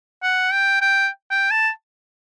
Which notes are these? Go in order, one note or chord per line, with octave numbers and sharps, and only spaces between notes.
F#5
G5
G5
G5
A5